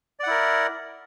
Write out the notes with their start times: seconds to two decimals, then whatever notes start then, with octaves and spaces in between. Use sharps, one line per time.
0.20 D5
0.23 F#5
0.27 E4
0.31 A#4